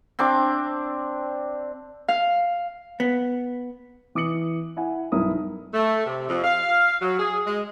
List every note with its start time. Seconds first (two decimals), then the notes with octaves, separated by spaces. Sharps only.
0.19 C4 D4 D6
2.08 F5
3.00 B3
4.15 E3 D6 D#6 C#7 F#7
4.77 E4 F#5 G#5
5.12 B1 G2 E4 A#4 D#6
5.74 A3
6.07 C3
6.29 F2
6.44 F5
7.01 F#3
7.20 G#4
7.47 G#3